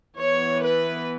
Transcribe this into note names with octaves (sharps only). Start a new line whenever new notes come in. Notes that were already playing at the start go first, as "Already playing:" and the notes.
E3 B3 C#5
B4